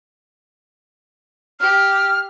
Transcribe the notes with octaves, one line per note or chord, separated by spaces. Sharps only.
G4 F6